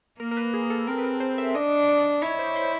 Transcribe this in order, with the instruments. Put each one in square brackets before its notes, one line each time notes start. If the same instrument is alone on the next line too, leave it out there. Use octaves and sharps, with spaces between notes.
[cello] A#3 [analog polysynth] A#4
[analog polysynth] A#4
B4
G#4
A4
[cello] C4 [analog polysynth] A#4
[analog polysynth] B4
A#4
C5
E5
[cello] D4 [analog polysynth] D#5
[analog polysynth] D5
[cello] E4 [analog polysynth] C#5
[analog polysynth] C5
C5